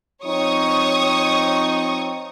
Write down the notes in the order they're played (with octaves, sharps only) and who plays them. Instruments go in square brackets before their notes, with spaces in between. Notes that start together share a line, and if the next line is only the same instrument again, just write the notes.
[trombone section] F3 C4 D#4 [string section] C#5 C#6 D#6